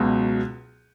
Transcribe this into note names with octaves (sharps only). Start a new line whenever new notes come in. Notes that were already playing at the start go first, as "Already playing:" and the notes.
Already playing: C#2 B2 F#3